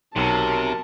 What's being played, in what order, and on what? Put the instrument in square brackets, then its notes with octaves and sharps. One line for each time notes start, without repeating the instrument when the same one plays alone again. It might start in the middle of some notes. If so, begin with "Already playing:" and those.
[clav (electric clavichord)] B1 [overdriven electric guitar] C3 [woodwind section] C#4 F#4 A#4 [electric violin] A5